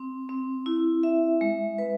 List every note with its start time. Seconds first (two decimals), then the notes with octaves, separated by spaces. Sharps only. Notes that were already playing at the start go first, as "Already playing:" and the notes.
Already playing: C4
0.29 C4
0.66 E4
1.03 E5
1.41 G#3
1.78 B4